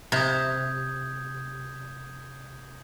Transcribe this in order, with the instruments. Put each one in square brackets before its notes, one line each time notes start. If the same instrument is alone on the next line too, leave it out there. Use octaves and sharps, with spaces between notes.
[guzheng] C3 [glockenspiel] D#6 G6 G#6